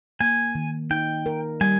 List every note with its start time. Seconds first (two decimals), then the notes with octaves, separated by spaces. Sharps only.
0.21 A#3 G#5
0.55 D#3
0.91 D#4 G5
1.26 A#4
1.61 G3 G#5